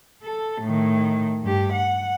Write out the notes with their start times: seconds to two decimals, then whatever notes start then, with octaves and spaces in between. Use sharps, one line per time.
0.23 A4
0.62 A2 D#3
1.43 G2 G4
1.73 F#5